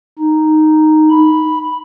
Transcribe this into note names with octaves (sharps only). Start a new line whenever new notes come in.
D#4
B5